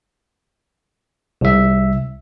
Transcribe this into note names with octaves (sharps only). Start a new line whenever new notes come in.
C2 E5